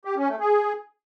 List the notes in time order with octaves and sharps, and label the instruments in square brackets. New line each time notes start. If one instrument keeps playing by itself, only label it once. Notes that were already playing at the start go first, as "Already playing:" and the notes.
[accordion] G4
C#4
A3
G#4